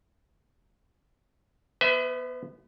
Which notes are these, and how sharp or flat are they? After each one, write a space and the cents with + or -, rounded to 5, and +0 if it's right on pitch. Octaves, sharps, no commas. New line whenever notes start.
B3 -15 B4 +40 E5 -15